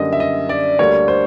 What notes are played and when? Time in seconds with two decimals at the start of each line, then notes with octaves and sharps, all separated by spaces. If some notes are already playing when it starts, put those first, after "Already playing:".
Already playing: F#2 D3 G3 A#3 D#5
0.13 E5
0.20 D#5
0.49 D5
0.79 D2 D3 G3 A#3 C#5
1.08 C5